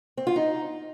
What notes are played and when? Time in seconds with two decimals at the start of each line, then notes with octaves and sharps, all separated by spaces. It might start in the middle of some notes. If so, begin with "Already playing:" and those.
0.17 C4
0.27 F4
0.36 D#4